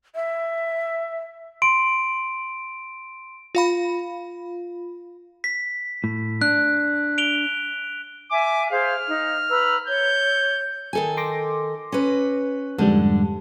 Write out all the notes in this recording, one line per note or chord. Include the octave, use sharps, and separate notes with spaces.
E5
C6 D7
F4 F5 B5
B6
A2
D4 F#6
D7 F7 G7
E5 G#5 D6
G#4 C5 F5 F6
D#4
B4 A#5 E6
C#5 G6
D#3 A4 G#5
C6 D6 A#6
C#4 B4
F2 G#2 D3 G3